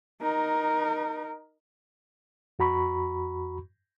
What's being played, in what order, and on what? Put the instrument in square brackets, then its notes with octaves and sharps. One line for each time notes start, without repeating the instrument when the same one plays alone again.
[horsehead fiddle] D#4 A#4
[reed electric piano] F2 F#4 A#5 B5 C#6